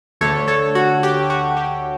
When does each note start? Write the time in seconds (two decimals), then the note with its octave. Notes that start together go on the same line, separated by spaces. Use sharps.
0.21 D2 D3 A3 A4 C#5
0.48 A4 C#5
0.75 F#4
1.03 G4
1.30 F#4
1.57 G4